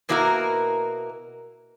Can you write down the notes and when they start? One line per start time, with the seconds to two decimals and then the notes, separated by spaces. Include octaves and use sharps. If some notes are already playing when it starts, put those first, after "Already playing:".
0.09 B2 A#3 D4 E4 F#4 A#4